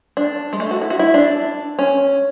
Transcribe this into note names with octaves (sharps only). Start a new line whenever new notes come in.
D4
G#3
A3
F#4
E4
F#4
E4
D4
C#4